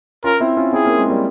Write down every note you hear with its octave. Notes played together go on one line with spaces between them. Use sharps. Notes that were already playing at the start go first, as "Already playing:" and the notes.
C#4 F4 A#4
C4 E4
C#4 F4
C4 E4 G#4
A#3 C#4
G#3 C4
G3 A#3